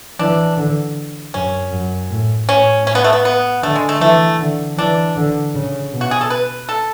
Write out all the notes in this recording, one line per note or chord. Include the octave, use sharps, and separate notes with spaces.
E3 D4
D3
F#2 C#4
F#2
A2
A2 C#4
C#4
B3
A3
B3
B3
D3 A3
G#3
A3
E3 A3
D3
E3 D4
D3
C#3
B2
F#4
G#4
A4
B4
A4